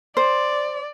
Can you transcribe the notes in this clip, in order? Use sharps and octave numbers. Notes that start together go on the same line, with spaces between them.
C5 D5